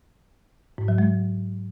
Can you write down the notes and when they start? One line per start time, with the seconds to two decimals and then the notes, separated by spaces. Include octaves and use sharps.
0.78 G#2
0.88 F#3
0.98 G#3